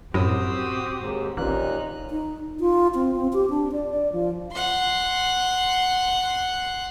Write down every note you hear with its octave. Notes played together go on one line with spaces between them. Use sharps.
F#2 A2 C4 F#4 G4 D#6 E6
D#2 G#2
A1 D#2 A#2 D#4 F#6
D#4
F4
C4
C4
G4
D4
D5
D5
F3
F#5 C6